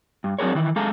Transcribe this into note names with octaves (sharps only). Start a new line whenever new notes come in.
G2
F#3 C4 D4 G#4 A#4 C#5
D#3 E3
G#3 A4 F5 A#5